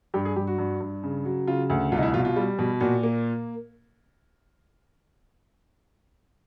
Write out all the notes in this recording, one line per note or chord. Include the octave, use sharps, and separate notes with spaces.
G2 G4
G#4
G2 G4
F#4
G2
G2
C#3
F#3
C#3 F4
D2
C2 F4
D#4
E4
B2 F4
F4
G3
B2
A#2 F#4
A#3